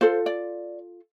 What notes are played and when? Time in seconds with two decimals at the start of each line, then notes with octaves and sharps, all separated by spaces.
0.01 F4 A4 C5
0.26 D5